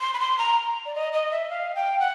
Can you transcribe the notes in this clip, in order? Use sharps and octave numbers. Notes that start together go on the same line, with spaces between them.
C6
B5
C6
A#5
D5
D#5
D#5
E5
F5
G5
F#5